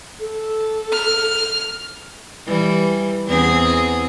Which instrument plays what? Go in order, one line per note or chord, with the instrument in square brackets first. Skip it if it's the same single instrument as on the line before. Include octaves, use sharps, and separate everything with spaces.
[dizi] A4
[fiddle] F6
[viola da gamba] E3 G3
E2 C4 G#4